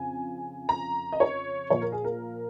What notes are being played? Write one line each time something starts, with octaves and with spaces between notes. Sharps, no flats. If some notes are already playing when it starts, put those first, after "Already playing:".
Already playing: F2 C#3 F3 G#5
A#5
D#5
C#5
A#2 F3 C#5
A#4
G#4
A#4